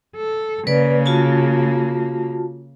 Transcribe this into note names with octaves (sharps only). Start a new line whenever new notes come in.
A4
C#3 A#3 B4 D5
F4 F#4 A5